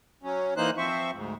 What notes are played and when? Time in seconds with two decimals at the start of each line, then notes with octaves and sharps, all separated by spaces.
0.23 F#3 C#4
0.57 E3 A#3 D#4 C5 F#6
0.78 F3 C4 C5 E5 C#6
1.13 D2 G#2